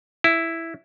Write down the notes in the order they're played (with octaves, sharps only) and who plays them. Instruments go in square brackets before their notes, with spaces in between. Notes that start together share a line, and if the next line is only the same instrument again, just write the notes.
[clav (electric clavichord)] E4